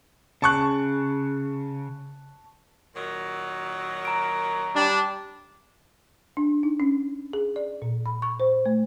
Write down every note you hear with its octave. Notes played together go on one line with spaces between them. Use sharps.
C#3 A5 C#6 F#6
A#2 D#3 F#3
A#5 D7
G3 D4
D4
D#4
C#4
G#4
D5
A#2
B5
C#6
C5
A3